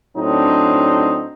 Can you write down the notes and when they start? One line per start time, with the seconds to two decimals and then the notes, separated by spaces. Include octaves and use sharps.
0.17 A2 F#3 C4 D4 D#4